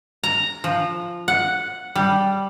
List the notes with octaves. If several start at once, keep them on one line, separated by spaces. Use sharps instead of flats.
A#5
F3
F#5
G3